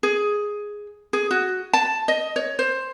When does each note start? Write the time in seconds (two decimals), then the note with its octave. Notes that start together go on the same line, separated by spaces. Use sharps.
0.03 G#4
1.13 G#4
1.31 F#4
1.73 A5
2.08 D#5
2.36 C#5
2.59 C5